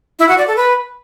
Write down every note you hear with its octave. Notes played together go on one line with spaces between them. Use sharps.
E4
F#4
D5
A4
B4